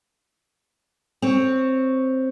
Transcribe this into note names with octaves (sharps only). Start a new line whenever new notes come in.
C4 C#5